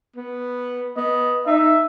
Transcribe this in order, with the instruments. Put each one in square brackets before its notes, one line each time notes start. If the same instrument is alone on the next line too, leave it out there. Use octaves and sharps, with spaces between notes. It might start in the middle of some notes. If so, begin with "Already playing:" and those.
[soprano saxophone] B3
[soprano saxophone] B3 [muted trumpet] D#5
[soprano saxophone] D#4 [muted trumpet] E5